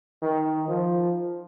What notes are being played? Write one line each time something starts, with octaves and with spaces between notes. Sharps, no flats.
D#3
F3